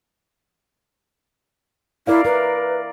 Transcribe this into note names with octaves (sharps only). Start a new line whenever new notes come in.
E4 A#4 D5 F5
E4 A#4 B4